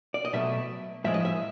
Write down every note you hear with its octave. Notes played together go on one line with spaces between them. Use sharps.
D5
D#5
B2 F#3 A3 E5
A2 F3 G#3 E5
D#5
E5